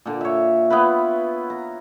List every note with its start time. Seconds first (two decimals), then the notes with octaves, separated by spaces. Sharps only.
0.05 A#2 D3
0.21 C#5 E5
0.70 B3 E4 F4 B4
1.50 A#5